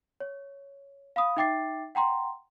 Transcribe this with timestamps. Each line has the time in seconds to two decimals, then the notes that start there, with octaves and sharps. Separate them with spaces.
0.20 C#5
1.16 F5 B5 D#6
1.37 D#4 E5 G5 D6 A6 C7
1.95 F#5 G5 A#5 C6